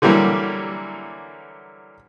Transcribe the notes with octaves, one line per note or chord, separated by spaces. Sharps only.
D3 E3 F#3 G3 A#3